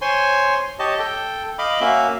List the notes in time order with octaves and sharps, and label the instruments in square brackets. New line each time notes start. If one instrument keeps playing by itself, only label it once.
[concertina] C5 C#5 G#5 C6
G4 C#5 D#5 A5
A4 G5
D#5 F5 B5 D6
A#3 C#4 F#4 E5 F5